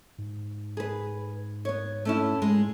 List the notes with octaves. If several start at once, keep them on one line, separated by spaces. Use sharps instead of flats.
G#2
G#4 B4
B3 C#5
A3 C#4 E4
G#2 G#3